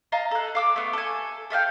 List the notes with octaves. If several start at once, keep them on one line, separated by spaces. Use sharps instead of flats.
D#5 F5 A5 A#5
A4 F#6
F5 D6 E6
A3 B3
A4 G#5
A4 E5 F5 G5